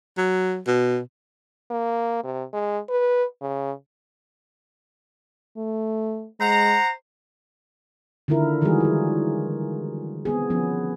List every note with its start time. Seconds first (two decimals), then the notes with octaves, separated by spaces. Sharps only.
0.17 F#3
0.67 B2
1.71 A#3
2.24 C3
2.53 G#3
2.89 B4
3.42 C#3
5.57 A3
6.40 G#3 C5 F#5 A#5
8.28 D3 D#3 E4 F4 A#4
8.62 D#3 E3 G3 G#3 F#4 G#4
8.80 F#3 F4
10.25 B3 C4 G#4
10.50 F3 B3 C#4